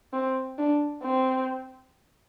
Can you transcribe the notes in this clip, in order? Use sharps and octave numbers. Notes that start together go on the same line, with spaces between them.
C4
D4
C4